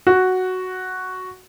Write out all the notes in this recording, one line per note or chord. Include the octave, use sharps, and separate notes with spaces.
F#4